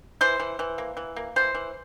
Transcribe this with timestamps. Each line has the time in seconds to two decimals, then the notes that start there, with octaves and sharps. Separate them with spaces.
0.21 E3 C5
0.40 E3
0.59 E3
0.78 A#3
0.97 E3
1.16 A#3
1.36 E3 C5
1.55 E3